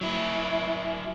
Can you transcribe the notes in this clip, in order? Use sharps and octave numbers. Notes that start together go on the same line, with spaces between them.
F#3 E4